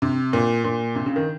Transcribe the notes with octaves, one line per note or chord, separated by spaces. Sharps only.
C3
A#2
A#2
C3
C#3
D#3